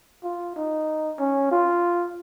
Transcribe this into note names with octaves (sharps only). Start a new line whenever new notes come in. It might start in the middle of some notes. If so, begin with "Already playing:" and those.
F4
D#4
C#4
F4